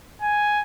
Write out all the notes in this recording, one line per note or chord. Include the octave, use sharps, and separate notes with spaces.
G#5